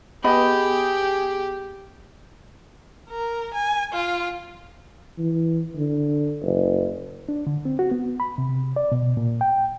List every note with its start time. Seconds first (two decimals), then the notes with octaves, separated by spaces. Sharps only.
0.24 B3 G4 G#4 D#5 B5
3.09 A#4
3.53 G#5
3.93 F4
5.18 E3
5.75 D3
6.42 F#1
7.29 D4
7.47 D3
7.65 C4
7.79 F#4
7.91 B3
8.20 B5
8.38 C3
8.76 D5
8.92 B2
9.17 A#2
9.41 G5